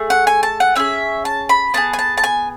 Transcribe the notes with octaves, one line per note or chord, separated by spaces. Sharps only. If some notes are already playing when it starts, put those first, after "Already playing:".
Already playing: A3 G#4
F#5
G#5
A5
F#5
C#4 E4 G#4 E5
A5
B5
B3 E4 G#4 A5
G#5
A5
A5
G#5